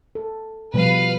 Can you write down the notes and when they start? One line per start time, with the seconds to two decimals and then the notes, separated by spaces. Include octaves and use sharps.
0.15 A4
0.74 B2 F3 G3 B4 F5